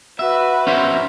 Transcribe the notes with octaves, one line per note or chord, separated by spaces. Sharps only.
F#4 B4 E5
C#4 C5 E5